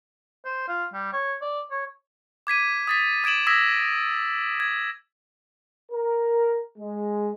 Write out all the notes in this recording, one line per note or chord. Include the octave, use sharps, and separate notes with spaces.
C5
F4
G3
C#5
D5
C#5
D6 G#6 B6 D#7
D#6 A6 B6
D#6 G#6 D7 E7 F#7
D#6 E6 G#6 A#6 B6
G#6
A#4
G#3